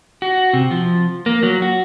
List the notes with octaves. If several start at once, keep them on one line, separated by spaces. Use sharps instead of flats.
F#4
C3
F3
A#3
F#3
F#4